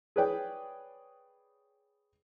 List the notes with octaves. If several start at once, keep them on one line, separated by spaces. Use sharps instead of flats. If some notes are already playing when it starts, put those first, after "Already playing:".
G#4 B4 C#5 D5 G5